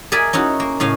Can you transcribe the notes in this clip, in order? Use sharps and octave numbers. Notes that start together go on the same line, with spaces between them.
G#4 A#4 D5 E5 G#5
C#4 D#4 E4 F#4
A#3
A2 C#3 F5 G#5